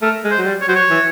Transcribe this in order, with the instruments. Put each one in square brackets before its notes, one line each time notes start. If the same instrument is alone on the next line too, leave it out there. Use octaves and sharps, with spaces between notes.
[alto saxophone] A3 [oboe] A#4
[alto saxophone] G#3
[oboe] C5
[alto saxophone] F#3
G3
[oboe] C#5
[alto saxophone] F#3 [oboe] C5
[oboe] C#5
[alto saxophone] E3